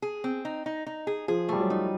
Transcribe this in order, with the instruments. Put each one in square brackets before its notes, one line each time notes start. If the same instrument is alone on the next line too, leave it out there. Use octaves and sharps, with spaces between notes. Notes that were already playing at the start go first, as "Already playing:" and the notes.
[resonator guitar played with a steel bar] G#4
C4
D#4
D#4
D#4
G#4
[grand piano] F3 [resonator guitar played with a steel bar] G#4
[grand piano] G3 [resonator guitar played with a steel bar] A3
[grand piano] F#3
[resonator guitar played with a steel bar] D#4